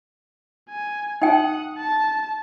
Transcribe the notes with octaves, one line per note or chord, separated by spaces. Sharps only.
G#5
D#4 F#5 G5 D#6
A5